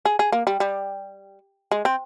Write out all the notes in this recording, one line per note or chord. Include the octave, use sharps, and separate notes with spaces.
G#4
G#4
A#3
G3
G3
G#3
C4